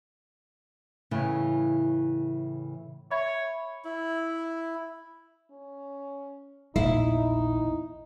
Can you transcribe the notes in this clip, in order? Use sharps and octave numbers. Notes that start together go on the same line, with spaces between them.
A2 C#3 E3
C#5 E5 B5 G#6
E4
C#4
A#1 E2 D#4 E4